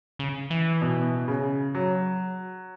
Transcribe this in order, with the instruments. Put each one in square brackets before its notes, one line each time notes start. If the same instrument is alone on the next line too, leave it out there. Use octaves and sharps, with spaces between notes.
[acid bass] C#3
E3
[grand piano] B2
C#3
F#3